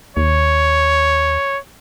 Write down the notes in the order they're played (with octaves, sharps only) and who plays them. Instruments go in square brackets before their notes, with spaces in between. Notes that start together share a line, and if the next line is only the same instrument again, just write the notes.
[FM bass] D#2 [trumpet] C#5